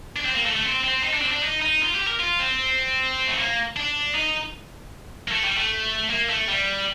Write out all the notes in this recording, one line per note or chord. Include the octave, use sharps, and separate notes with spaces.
D4
C4
A#3
A3
A3
C4
C4
D#4
D4
C4
D4
D#4
D#4
F4
G4
A#4
F4
C4
A3
A#3
D4
D#4
A#3
A3
G3
A3
A#3
A3
G3